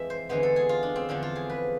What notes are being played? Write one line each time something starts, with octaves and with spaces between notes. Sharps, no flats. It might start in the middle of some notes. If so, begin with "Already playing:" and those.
Already playing: F2 E3 G#3 E5
C5
E2 D3 G#3 B3 C5
A4
G#4
F4
D4
C4
E2 D3 F3 D4
F4
G#4
B4